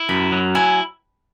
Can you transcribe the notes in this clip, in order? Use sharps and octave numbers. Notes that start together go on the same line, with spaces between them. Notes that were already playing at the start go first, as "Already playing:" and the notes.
Already playing: E4
F#2 B5
F#3
E4 G#5